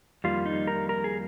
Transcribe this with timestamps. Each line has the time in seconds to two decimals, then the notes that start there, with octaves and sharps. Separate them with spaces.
0.24 F2 D#3 G3 A#3 F4
0.46 D#4
0.67 A#4
0.89 A#4
1.04 G#4